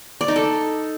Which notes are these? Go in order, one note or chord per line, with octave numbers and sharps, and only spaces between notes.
D5
D#4
A4